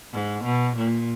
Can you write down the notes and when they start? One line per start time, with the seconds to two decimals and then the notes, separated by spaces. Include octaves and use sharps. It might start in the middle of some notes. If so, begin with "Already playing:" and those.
0.13 G#2
0.45 B2
0.77 A#2